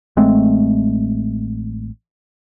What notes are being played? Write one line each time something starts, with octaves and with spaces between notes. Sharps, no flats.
A1 G#3 A3 C4